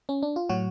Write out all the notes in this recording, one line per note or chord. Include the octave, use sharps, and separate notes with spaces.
C#4
D4
F4
A2 F#3 F#4